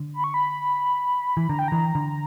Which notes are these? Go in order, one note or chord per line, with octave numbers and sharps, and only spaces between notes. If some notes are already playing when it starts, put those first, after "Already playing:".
Already playing: D3
B5
C#6
B5
E3
D3 A#5
G5
E3 A#5
D3